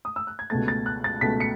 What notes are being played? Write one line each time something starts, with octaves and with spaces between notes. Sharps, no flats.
D#6
E6
F#6
G#6
C#2 B2 A3 A6
A6
F#6
A6
C#2 B2 A3 B6
C#7